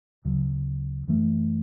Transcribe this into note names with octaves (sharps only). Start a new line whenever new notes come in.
D2 C#3 F#3
F#2 E3 A3